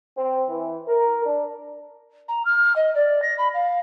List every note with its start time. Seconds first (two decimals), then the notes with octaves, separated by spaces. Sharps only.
0.16 C4
0.49 E3
0.88 A#4
1.25 D4
2.28 A#5
2.45 F6
2.76 D#5
2.95 D5
3.22 A#6
3.38 B5
3.54 F5